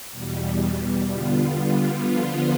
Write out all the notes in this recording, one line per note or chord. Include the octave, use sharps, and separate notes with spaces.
E2 B2 G3
D3 G3 B3 F4
D3 F3 B3 F4